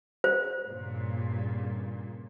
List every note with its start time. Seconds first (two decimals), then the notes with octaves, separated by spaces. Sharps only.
0.24 C5
0.68 G2 A#2 C#3